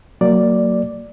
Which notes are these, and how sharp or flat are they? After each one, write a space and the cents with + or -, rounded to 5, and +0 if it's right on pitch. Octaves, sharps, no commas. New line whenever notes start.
F#3 +0 A#3 -20 D5 +0